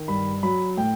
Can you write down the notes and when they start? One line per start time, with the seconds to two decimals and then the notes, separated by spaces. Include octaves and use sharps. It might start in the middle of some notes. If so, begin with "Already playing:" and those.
Already playing: D#3
0.08 G2 B5
0.43 F#3 B5
0.77 A2 G5